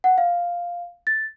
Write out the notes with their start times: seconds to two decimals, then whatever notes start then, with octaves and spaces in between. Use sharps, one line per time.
0.04 F#5
0.18 F5
1.07 A6